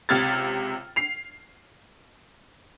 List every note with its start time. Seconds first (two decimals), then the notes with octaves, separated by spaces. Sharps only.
0.09 C#2 C3 F6 G#6 A6
0.96 C7 F7